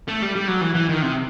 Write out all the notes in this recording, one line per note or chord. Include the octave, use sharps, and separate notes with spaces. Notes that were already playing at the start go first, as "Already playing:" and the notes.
A3
G3
G3
F#3
E3
E3
D#3
C3